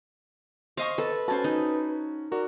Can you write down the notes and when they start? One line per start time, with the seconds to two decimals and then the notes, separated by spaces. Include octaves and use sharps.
0.77 C5 D#5 F5 C#6
0.98 A4 B4
1.28 C#4 F#4 C5 G#5 A5
1.44 D#4
2.32 F#4 A#4 D5